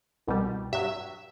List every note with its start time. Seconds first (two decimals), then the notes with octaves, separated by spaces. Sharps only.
0.27 C2 B2 G3
0.73 G2 F#3 E5